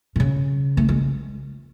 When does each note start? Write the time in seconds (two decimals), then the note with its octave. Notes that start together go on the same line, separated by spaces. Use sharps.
0.16 C3
0.20 C#3
0.77 A3
0.89 G#3